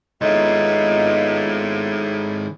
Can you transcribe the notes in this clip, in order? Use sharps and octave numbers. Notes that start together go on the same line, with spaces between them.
A2 D#3 G#3 B3 D#4 F4 D5